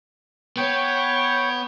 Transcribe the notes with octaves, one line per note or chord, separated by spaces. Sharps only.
B3 C#5 G5